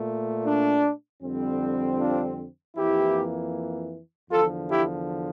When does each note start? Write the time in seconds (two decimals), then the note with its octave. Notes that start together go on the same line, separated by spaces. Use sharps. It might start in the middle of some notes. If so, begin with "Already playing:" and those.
Already playing: A#2 A3
0.44 D4
1.22 F2 D3 G3 C4
1.99 D4 F4
2.76 F2 E3 A#3 E4 G4
4.30 E2 D3 F3 F4 A4
4.69 E4 G4